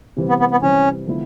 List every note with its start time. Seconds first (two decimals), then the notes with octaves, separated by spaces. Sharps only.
0.17 C3 E3 G3 C4
0.29 B3
0.40 B3
0.51 B3
0.62 C3 E3 G3 C4 C#4
1.06 D3 F3 G#3 B3 E4